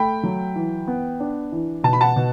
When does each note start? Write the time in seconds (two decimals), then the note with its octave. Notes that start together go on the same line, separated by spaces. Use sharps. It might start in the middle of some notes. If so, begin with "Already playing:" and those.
Already playing: A3 G5 B5
0.23 F#3
0.56 E3
0.88 B3
1.20 D4
1.52 E3
1.84 B2 A5
1.93 B5
2.01 F#5 A5
2.16 B2